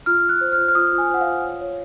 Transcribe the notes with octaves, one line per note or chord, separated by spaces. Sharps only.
F4 F6
F4
F#6
C5
F6
F4
F6
F4 D#6
F4
G#5
C5 F#5
F5
F4
C#5
C#5